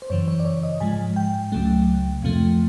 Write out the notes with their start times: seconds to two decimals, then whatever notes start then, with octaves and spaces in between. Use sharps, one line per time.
0.02 C5
0.10 F#2 C#3 E3 C#5
0.28 C#5
0.40 D5
0.45 C#5
0.63 D#5
0.80 G#2 F3 G#3 G#5
1.16 G5
1.52 C#2 C#3 F#3 A3
2.22 F2 C3 F3 A3